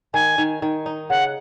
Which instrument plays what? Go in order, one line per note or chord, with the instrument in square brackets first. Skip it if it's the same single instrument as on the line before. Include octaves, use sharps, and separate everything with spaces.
[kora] D#3 [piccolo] G#5
[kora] D#3
D#3
D#4
[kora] C#3 [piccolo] F#5